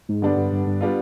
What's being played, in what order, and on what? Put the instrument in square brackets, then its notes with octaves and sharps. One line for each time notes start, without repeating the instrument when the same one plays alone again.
[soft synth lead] G#2
[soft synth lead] G2 [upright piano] D3 G3 B3 D4
[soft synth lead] G2
G2
G2
[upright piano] G3 B3 D4 F4